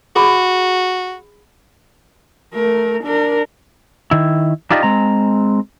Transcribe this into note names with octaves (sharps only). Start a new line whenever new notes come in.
F#4 G#4 B5
A3 A#4
D4 A#4
D#3 E4
D4 D#4 F4 G4 D5 D#5
G#3 C4 A#5